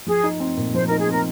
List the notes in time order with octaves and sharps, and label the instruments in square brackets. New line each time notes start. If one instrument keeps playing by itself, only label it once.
[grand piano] F3 [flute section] G#4
[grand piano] D#4
C4
A#2
[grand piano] F3 [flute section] C5
[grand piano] D#4 [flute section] A#4
[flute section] G#4
[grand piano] C4 [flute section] A#4